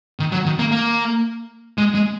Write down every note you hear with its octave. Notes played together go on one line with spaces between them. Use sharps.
D#3
F#3
D#3
A#3
A#3
G#3
G#3